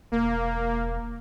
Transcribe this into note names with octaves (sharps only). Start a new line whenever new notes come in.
E1 A#3